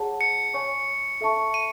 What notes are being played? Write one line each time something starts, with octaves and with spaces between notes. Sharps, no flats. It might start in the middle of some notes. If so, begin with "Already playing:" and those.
Already playing: G#4 C#5 F#5 A5
C#7
C#5 G#5 C#6
A4 E5 A5 C#6
D#7